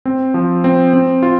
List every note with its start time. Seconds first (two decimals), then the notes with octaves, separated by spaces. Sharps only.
0.05 C4
0.34 F3
0.64 C4
0.93 C4
1.23 F4